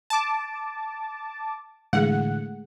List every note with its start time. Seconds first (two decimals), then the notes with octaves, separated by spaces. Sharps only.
0.10 A5 D6
1.93 A2 D3 E3 G#3 A3 G#4 F#5